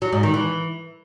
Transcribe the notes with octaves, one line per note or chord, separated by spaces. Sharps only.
F#3
G#2
D#3
E3